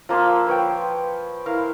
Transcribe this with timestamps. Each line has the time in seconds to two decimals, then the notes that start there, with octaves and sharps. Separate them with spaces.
0.09 F3 A#3 C6 E6
0.47 B4 C#5 G5
1.46 E4 A#4 C5 F5